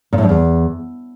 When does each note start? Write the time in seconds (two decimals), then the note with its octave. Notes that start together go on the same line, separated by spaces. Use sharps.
0.13 A#2
0.18 A2
0.24 G2
0.29 E2